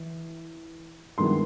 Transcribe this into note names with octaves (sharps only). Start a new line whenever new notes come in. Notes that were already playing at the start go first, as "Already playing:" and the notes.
Already playing: E3
G2 D#3 G#3 B3 E4 C6